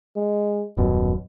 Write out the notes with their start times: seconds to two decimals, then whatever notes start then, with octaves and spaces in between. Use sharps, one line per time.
0.16 G#3
0.77 D#1 F#2 B2